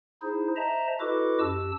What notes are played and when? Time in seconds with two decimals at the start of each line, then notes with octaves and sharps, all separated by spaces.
0.22 D#4 E4 G#4 C5
0.56 C5 D#5 E5 A5 A#5
1.00 E4 F#4 A4 B4 D#5 D6
1.40 F#2 G4 A5 E6